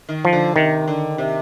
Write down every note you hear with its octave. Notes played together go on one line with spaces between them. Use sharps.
D#3
F3
D3
C3 D#3
D3
C3